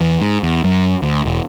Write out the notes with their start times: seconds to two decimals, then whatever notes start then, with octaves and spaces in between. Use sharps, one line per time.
0.01 E2
0.21 G#2
0.43 E2
0.64 F#2
1.02 D2
1.26 E1